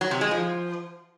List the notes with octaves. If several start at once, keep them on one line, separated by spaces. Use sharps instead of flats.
F#3
C3
G#3
F3